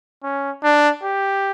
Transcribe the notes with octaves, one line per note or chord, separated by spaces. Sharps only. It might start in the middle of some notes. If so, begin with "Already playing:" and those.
C#4
D4
G4